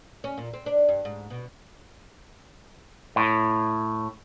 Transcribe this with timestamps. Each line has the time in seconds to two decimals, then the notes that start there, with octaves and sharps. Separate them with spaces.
0.24 C#4
0.38 A#2
0.54 C4
0.66 D4
0.89 G2
1.05 G#2
1.30 B2
3.16 A2